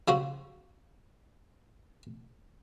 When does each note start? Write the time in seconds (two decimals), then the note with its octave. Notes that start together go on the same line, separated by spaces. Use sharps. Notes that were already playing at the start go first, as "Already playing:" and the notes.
0.08 C#3 F3 F#4